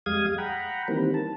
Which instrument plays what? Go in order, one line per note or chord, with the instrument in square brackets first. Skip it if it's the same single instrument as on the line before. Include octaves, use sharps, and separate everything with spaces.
[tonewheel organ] F2 G3 G#3 F5 D#6 G#6
F#5 G5 A#5 B5
D#3 E3 G3 A#3 C4
A5